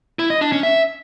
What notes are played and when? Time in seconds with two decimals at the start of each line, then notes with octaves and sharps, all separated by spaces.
0.19 E4
0.30 D#5
0.41 D4
0.52 C#4
0.63 E5